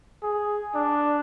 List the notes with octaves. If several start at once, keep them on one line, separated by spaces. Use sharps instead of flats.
G#4
D4